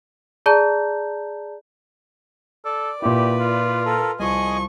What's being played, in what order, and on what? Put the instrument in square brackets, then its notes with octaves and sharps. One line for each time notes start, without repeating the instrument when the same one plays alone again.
[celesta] G#4 D5 A5 A#5 G6
[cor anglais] A4 [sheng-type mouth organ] D5
[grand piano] A#2 E4 [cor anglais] G4 [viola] B4
[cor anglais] F4
[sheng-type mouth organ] A4 A#4
[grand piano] C2 [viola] F3 C#6 [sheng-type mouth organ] G#4 D#5 G#5